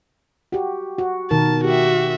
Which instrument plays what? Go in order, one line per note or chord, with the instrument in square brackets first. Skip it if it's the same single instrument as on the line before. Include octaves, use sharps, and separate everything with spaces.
[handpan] F#4 G4
F#4
[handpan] B2 D#3 A#4 [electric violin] A5
[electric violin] F#4 E5 [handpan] G4